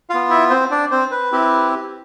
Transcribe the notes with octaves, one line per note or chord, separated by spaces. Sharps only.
B3 F4 F5
E4 E5
C4 C5
D4 D5
C4 C5
B4
C4 E4 G4